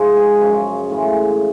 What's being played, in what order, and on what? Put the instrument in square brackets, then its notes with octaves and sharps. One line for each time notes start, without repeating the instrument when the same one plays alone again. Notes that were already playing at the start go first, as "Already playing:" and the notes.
Already playing: [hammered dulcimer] G#2 F3 G#3
G#4
F#2 C#3 F3
A2 E3 G#3